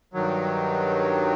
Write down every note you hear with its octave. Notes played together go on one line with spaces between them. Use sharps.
G2 D#3 F#3